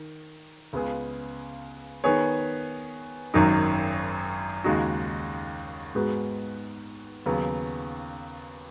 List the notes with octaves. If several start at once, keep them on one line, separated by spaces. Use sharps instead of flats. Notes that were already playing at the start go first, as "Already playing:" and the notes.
Already playing: D#3
C#2 C#3 G#3 B3 G#4
D#3 B3 G#4 C#5
G#1 F#2 D#3 F#3 D#4
D#2 C#3 G#3 D#4 F#4
G#2 G#3 B3 F#4
D#2 C#3 F#3 B3